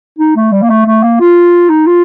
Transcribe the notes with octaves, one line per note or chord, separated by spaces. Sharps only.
D#4
A3
G3
A#3
A3
A3
A#3
F4
D#4
F4